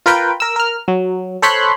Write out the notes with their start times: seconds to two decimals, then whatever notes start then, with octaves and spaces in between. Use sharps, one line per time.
0.06 F4 A#4 B4 G5
0.40 A#4 E6
0.56 A#4 F6
0.88 F#3
1.42 A4 C5 C#5 B5 C6 F#6